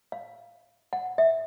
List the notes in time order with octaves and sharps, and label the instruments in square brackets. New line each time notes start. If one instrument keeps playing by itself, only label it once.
[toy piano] F5
F#5
E5